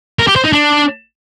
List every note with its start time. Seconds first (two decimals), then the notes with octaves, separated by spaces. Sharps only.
0.19 A#4
0.27 G4
0.36 C5
0.44 D#4
0.53 D4